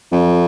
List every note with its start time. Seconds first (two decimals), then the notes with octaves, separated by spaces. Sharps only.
0.12 F2